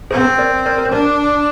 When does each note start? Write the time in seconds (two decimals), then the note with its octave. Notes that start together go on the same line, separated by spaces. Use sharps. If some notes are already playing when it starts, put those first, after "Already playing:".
0.11 C4 G#4 C5
0.38 A#4 D5
0.66 A#4 D5
0.78 A#4
0.85 C5
0.92 D4 A#4 D5